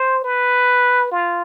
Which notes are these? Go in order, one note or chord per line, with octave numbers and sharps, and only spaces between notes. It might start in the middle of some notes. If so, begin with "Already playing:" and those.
Already playing: C5
B4
F4